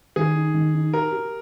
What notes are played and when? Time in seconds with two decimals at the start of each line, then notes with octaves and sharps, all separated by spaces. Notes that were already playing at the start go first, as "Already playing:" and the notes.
0.16 D#3 G#4
0.35 D#4
0.54 D#3
0.74 D#4
0.93 G4 A#4
1.12 G4